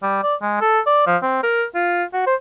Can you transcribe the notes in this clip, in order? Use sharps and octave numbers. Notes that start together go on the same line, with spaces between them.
G3
D5
G#3
A4
D5
F3
C4
A#4
F4
F#4
C5